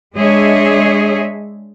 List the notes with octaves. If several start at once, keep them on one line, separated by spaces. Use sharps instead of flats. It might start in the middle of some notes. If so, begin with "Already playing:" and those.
G#3 D4 G#4 C#5 D#5 E5